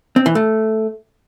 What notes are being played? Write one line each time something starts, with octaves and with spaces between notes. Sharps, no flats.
C4
E3
A3